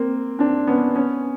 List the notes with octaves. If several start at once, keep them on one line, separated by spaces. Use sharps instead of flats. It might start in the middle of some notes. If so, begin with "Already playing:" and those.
Already playing: A#3 C4
C4 D4
B3 C#4
B3 C#4